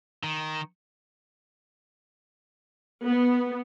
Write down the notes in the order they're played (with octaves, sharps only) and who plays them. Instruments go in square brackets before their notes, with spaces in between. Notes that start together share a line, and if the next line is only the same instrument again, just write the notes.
[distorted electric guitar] D#3
[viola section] B3